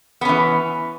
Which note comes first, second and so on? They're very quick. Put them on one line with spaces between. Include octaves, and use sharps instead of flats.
B3 C#4 E3